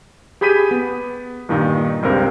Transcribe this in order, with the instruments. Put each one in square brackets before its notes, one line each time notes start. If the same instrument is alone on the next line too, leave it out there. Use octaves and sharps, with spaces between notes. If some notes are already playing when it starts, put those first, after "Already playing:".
[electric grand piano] G4 G#4 B5 G6 B6 D#7
B3
G2 A#2 D#3 D#4
C#2 G2 C3 A#4 C5